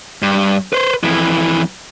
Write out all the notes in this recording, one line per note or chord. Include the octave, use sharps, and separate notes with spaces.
G2
B4 C5
F2 E3